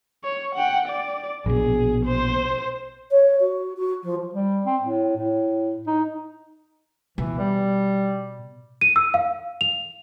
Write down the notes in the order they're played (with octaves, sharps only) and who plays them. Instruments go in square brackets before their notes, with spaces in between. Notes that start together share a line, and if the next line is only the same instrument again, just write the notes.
[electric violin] C#5
F#5 G5
D5
[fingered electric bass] A#1 B2 [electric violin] G#4
[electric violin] C5
[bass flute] C#5
F#4
F#4
F3
[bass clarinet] G3
C4
A2
A2
D#4
[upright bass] B2 [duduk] E3
[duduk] G3
[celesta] D#7
E6
F5
F7